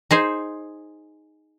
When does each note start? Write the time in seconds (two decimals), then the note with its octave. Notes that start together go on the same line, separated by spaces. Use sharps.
0.11 D#4 G#4 C5